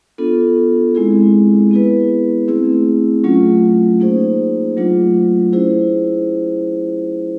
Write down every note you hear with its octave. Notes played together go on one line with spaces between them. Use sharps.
B3 D4 F4 A4
G#3 C4 E4 G#4
B3 E4 G#4 B4
A3 C4 E4 G#4
F#3 A3 C#4 F4
A#3 D#4 G#4 C5
F#3 A3 D4 F4
C#4 E4 G#4 C5